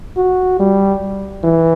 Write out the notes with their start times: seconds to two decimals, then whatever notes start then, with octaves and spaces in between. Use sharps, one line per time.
0.17 F#4
0.59 G3
1.43 E3